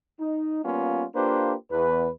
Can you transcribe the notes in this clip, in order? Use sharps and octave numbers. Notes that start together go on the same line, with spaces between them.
D#4
G3 A#3 B3 C#4 F4
A#3 D4 F4 G4 B4 C5
E2 B4